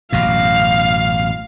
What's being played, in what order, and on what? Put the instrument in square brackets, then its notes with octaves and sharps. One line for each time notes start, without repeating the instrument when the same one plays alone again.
[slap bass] A1 F#2 B2 [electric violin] F5